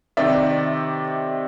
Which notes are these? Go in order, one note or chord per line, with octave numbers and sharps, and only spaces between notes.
C3 D#3 D5 E5